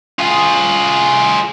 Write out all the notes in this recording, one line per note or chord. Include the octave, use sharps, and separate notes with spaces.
F4 G#4